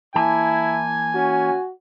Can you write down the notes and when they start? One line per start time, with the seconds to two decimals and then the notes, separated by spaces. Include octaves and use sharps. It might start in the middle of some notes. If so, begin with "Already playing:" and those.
0.15 E3 A#3 E4 G#5 A5
1.14 C#4 F#4